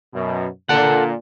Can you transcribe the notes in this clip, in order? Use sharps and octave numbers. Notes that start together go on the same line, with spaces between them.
F#2 B2
A#2 D3 A4 F#5